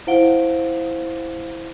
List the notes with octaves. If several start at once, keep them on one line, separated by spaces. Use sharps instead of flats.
E4 C5 F5 F#5 D7 G7